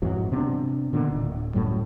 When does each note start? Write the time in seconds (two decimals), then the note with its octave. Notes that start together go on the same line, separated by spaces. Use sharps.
0.02 F2 G#2 E3 F#3
0.32 C3 B3 C#4 D4
0.93 A#2 D3 D#3 B3
1.10 D1
1.54 F#2 A2 F#3 G3